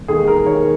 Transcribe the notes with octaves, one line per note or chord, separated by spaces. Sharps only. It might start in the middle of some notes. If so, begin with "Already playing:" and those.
Already playing: E1
D#2 G#4
D#2 A#4
D#3 C#5